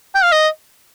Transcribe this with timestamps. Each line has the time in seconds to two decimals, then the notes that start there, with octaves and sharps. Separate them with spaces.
0.15 G5
0.23 F5
0.32 D#5